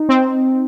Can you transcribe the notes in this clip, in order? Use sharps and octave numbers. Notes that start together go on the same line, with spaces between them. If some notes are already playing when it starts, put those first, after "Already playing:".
Already playing: D#4
C4